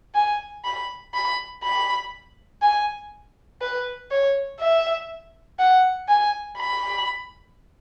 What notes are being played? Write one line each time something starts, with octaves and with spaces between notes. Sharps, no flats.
G#5
B5
B5
B5
G#5
B4
C#5
E5
F#5
G#5
B5